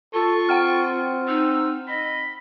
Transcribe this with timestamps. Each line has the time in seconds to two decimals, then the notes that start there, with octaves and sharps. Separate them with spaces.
0.14 F4 A4 C#6
0.49 C4 F#5 G5 F6
1.28 D#4 E6
1.88 D#5 B5